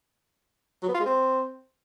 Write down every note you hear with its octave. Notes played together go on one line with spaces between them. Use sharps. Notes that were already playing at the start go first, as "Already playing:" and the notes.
F#3
B3
F4
G#3
C4